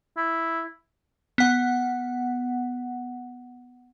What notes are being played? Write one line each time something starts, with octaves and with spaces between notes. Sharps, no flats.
E4
B3 F#5